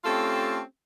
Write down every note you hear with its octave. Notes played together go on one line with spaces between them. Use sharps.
A3 C4 C#4 F4 G4 A4